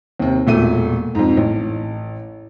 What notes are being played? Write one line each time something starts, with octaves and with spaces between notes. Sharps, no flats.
D#2 C3
E1 A#2 A3 D#7
F2 G#2
A1